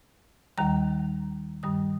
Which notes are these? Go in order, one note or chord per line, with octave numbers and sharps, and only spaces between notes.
D#2 D#3 G3 A#5
G2 D#3 G3 D#6